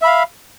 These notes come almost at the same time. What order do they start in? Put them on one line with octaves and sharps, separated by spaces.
E5 B5 F5